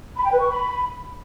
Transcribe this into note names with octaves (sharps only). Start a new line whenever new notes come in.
B5
G5
B4
C#6
B5